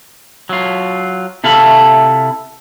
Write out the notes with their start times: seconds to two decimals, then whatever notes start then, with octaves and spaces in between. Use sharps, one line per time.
0.49 F#3 F4
1.44 C3 E4 A4 E5 F5 B5